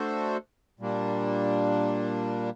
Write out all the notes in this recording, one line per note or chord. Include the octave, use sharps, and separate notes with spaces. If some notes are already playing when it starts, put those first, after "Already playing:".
Already playing: A3 D4 F#4 A4 C5
A#2 G3 A#3 D4